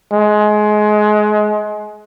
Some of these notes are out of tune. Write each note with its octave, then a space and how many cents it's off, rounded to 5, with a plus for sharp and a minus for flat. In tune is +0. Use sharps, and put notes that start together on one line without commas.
G#3 +25